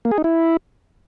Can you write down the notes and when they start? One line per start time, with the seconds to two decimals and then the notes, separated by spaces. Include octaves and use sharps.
0.05 A#3
0.11 G#4
0.18 D#4
0.24 E4